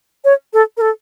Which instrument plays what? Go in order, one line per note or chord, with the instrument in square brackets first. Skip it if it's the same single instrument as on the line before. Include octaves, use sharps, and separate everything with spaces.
[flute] C#5
A4
A#4
A4